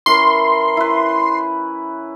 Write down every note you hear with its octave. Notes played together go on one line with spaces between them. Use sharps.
E3 C#4 A#4 C6
E4 B4